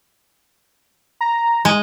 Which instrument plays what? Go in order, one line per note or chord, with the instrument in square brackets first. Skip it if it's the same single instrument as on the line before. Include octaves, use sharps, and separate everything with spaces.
[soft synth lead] A#5
[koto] G#3